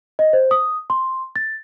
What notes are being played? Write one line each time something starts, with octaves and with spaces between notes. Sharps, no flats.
D#5
C5
D#6
C6
A6